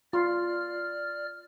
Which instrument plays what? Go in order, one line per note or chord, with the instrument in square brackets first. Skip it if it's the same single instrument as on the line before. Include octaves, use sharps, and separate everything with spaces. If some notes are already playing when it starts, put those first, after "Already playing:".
[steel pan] F4 [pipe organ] D5 F6